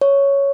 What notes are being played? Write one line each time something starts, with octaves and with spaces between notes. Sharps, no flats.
C#5